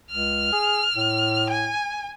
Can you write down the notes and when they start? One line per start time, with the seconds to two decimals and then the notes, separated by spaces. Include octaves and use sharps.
0.11 C#2 F6
0.53 G#4
0.95 A2
1.50 G#5